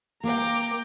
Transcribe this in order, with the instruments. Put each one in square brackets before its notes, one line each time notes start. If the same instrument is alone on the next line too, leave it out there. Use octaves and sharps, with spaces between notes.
[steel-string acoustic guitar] A#3 [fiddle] A#4 G5 [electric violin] A#5 D6